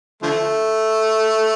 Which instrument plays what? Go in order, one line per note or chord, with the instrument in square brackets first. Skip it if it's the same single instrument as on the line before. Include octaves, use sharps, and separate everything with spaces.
[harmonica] D3 F3 A3